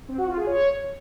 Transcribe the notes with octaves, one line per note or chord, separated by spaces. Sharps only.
C4
F#4
F4
G#4
C#5